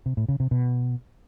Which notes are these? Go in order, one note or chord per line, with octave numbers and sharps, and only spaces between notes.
C3
A2
C#3
C3
B2